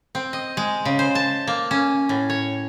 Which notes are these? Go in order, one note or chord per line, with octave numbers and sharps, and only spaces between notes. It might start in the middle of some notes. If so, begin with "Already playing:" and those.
C4
D#5
G#3
C#3
C5
A5
A#3
C#4
A2
C#5